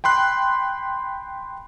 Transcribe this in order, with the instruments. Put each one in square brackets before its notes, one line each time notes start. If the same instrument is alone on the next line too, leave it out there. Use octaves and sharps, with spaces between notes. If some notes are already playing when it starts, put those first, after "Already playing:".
[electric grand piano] G5 B5 C6 F#6